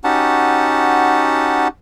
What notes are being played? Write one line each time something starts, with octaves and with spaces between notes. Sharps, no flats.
C#4 D#4 F#4 G4 F#5 A5